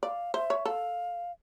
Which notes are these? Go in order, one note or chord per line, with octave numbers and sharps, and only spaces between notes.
D5 F5
C5 E5
C#5
A4 F5